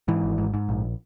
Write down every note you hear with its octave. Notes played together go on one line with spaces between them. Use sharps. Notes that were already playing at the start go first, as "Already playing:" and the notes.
G#2 E3
G#1
G#2
G#2
A#1